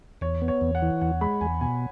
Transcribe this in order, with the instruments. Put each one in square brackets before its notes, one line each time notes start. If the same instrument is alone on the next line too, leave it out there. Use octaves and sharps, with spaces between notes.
[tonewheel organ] E2 [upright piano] C#5
[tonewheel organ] B3
[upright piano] C#5
[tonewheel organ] E2
[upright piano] F#5
[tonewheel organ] E3
[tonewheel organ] E2 [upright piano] F#5
[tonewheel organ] G#3 [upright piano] B5
[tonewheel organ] E2 [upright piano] G#5
[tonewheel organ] B2 [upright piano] G#5